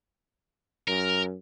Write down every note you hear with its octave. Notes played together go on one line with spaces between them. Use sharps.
F#2 A#4